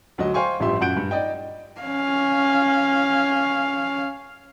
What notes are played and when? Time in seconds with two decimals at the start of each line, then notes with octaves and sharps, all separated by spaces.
0.18 D2 F#3 D#5
0.34 C5 F5 G5 G#5 C6 C#6
0.60 A1 G2 F3 G4 E5 C6
0.81 F#2 A#2 F#5 G6 D7
0.97 G2
1.11 D#4 D5 D#5 G5
1.82 C#4 F5